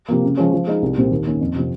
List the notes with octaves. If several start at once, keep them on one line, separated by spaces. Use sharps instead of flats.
C3 F3 A#3
C#3
F3 G#3 C#4
F3
G#3 D#4
C2
A#2 G3 C4 G4
D#2
D#3 A#3 C#4
F2
C3 F3 C4